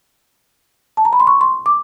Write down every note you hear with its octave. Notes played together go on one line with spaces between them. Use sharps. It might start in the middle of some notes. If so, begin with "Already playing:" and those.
A5
A#5
B5
C6
C#6
C6
D6